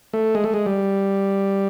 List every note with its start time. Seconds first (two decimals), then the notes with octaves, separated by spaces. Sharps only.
0.13 A3
0.35 G#3
0.44 A3
0.54 G#3
0.66 G3